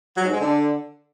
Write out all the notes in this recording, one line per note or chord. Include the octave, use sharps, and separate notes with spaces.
F#3
G#2
G#3
D3